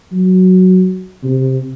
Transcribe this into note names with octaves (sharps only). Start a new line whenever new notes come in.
F#3
C3